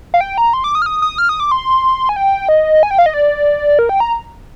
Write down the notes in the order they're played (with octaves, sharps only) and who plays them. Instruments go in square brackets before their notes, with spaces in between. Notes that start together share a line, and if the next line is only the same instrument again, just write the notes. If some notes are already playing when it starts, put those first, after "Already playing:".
[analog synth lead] F5
G5
A#5
C6
D6
D#6
F6
D#6
D#6
F6
D#6
D6
C6
G#5
G5
D#5
G#5
G5
F5
D#5
D5
A#4
G5
A#5